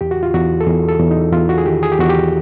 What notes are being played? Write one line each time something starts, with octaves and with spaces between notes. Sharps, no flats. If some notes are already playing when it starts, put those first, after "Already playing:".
E2 G4
F#4
F4
E2 F#4
A4
E2 G#4
A4
E2
D#4
E2 F4
F#4
G#4
D#3 G4
G#4
G4
E2 F#4
G4